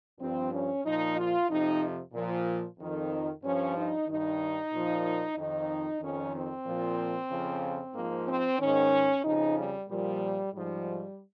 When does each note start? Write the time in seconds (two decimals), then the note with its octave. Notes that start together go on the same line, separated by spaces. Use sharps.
0.20 G2 F3 C4
0.52 C#4
0.84 A#2 F3 D#4
1.17 F4
1.49 F2 C3 F3 D#4
2.14 A#2 F3
2.78 F2 D#3
3.42 G2 F3 C#4
3.75 D#4
4.07 G2 D#3 D#4
4.72 A#2 F3
5.36 F2 D#3 D#4
6.01 F2 D#3 C#4
6.33 C4
6.65 A#2 F3
7.30 F2 C#3 F3
7.94 G#2 F3 A#3
8.27 C4
8.58 G#2 D#3 C#4
9.23 F2 C#3 F3 D#4
9.56 G3
9.88 A#2 F3 G3
10.52 G#2 F3 G3